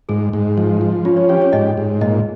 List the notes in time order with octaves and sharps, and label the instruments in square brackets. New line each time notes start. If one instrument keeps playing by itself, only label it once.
[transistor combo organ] G#2 [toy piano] G#4
[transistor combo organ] G#2
F3
F3
[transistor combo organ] C#4 [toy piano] F4
[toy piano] C#5
[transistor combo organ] G4 [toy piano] C#5
[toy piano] C#5
[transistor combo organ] G#2 [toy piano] D#5
[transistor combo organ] G#2
[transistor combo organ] A#2 [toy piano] D#5